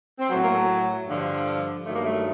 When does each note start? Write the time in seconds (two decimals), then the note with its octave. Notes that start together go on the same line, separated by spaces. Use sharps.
0.19 C4
0.29 F#3 B3
0.34 A2
0.43 A#3
0.55 A3
1.07 G2 D3 F3
1.84 G2 D#3 F#3 A3
1.94 A#3
2.04 A3